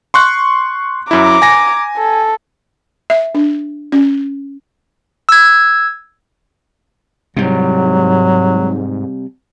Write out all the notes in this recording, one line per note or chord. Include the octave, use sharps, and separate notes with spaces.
C6 C#6 F#6
F#2 E4 A#5 D6
G#5 A#6
A4
E5
D4
C#4
E6 G#6
G#2 C3 F#3 G3